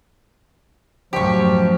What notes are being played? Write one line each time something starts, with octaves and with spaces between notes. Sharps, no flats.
F#2 A2 F3 G4 C#6